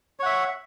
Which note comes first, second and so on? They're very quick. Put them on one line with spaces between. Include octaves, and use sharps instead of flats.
C#5 F#5 E5